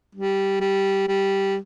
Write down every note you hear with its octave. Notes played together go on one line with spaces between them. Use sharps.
G3
G3
G3